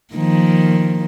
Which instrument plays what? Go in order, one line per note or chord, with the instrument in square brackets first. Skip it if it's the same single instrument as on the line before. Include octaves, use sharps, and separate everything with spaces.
[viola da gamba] D#3 F3 A#3